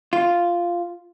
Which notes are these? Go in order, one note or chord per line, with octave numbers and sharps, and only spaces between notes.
F4